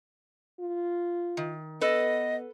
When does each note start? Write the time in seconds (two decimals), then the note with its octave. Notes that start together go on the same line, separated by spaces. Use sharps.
0.60 F4
1.37 D#3
1.81 B3 A4 B4 D#5